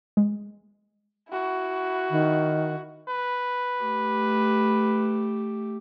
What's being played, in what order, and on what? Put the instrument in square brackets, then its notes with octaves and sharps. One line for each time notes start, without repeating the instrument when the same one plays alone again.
[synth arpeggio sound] G#3
[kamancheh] E4 F#4
[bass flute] D#3
[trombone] B4
[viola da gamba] A3 G4